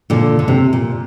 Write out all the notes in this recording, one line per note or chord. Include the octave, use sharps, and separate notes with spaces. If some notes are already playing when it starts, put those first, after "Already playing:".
A#2 D3
D3
C3
A#2